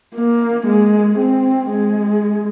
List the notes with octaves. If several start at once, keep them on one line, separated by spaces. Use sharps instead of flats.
A#3
G#3
C4
G#3